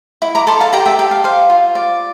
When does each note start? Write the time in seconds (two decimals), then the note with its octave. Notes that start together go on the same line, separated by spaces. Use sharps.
0.22 E4
0.35 A#5 D6
0.47 A4 A5 C6
0.60 F5 A5
0.73 G4 G5 A#5
0.85 E5 G5
0.99 G4
1.11 F5
1.24 C5 F5
1.50 F4
1.75 D5